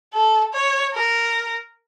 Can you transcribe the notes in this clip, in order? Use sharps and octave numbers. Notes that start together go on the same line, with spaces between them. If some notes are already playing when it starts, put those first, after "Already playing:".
A4
C#5
A#4